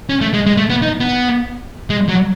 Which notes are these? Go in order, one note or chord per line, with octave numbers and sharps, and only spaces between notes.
C#4
A3
G#3
G#3
A3
B3
D#4
B3
G#3
F#3